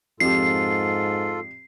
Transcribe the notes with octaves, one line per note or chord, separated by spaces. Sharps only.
F2 G#2 F4 G4 A4 C7